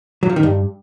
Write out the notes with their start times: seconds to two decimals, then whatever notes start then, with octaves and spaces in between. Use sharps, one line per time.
0.23 F#3
0.29 F3
0.36 D#3
0.43 G2